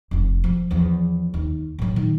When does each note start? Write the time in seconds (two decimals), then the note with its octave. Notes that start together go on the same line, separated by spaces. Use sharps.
0.11 F1 F2
0.44 F3
0.71 E2 F3
1.34 D#2
1.79 A2 F#3
1.96 A#2 D#3